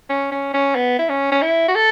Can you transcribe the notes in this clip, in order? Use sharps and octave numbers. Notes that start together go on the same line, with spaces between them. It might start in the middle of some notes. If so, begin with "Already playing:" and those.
C#4
C#4
C#4
B3
E4
C#4
C#4
E4
F#4
A4